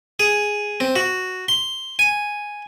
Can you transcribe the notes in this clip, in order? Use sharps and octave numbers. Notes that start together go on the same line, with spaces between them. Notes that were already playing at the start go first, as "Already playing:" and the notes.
G#4
C4
F#4
C6
G#5